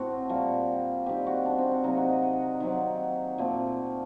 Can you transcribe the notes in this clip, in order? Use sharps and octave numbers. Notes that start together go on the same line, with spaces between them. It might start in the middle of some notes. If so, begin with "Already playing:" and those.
Already playing: A2 A3 C4 F#4
A#2 G3 A#3
D#3 G3 C4 G4
F#4
D4
C4
D4
C3 D#3 F#3 A#3 D#4
F#4
D#5
F#5
D#3 F#3 C4
A#2 A3 C4